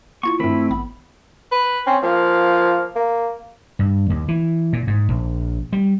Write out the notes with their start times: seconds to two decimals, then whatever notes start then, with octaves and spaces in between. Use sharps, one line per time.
0.23 A#3 E4 F4 C#6
0.40 G2 D#3 A3 C4 E4 B5
0.69 A1 B3 B5
1.52 B4
1.87 C4 C#4
2.03 F3 A#3
2.96 A#3
3.79 G2
4.10 D#2
4.28 E3
4.73 A#2
4.87 G#2
5.09 A#1
5.73 G3